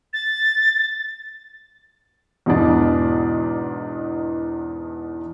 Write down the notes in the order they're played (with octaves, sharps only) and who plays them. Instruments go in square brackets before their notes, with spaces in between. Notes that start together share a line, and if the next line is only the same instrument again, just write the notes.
[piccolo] A6
[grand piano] E2 G#2 B2 E3 D4